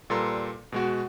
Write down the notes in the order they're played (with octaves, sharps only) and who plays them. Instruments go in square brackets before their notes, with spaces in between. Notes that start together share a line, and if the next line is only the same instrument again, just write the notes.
[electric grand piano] A#2 G3 A4 B4 A#5 C6
B2 G#3 F#4